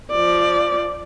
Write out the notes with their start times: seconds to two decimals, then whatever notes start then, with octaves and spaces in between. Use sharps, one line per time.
0.11 F3 D5